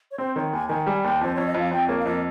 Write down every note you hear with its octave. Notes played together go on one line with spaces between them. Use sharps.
C#5
C4 C5
D#3 C#5
D#2 G#5
D#3 G#5
G3 G#5
D#2 G5
F2 C5
F2 C#5
D#5
F2 F5
F2 G5
A#3 C#5
F5
F2 D#5